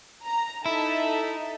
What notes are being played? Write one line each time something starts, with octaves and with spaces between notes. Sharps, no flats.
A#5
D#4 E4 A4 E5